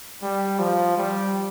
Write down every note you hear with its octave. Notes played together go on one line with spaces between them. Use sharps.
G3
F3
G3